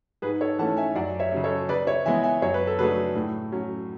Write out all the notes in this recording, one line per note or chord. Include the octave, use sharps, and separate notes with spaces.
G#2 G#4 B4
A4 C#5
E3 A3 C#4 F#5 A5
E5 G#5
F#2 D5 F#5
C#5 E5
C#3 F#3 C#4
A4 C#5
C#3 B4 D5
C#5 E5
E3 G#3 B3 E5 G#5
E5 G#5
F#2 C#5
B4
A4
C#3 F#3 A3 D4 G#4 B4
A2
F#3 C#4